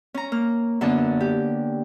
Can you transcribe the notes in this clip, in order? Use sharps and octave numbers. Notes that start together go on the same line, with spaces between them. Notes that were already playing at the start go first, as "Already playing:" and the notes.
C#4 A#5
A#3 F6
F#2 D3 A#3 B3 A5
G4